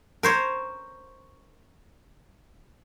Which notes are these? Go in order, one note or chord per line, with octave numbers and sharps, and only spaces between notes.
A#4 C5 C#5